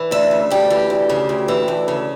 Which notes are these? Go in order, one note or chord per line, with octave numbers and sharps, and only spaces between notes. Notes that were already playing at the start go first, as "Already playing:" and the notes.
Already playing: E3
D2 E5
C#3
D2 G4
E3
D2
C#3
D2
E3
D2
C#3